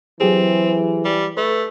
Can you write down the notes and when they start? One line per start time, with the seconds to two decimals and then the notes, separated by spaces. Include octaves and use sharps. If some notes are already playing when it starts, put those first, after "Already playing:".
0.20 E3 F#3 C4 G4 G#4
1.05 G3
1.37 A3 B4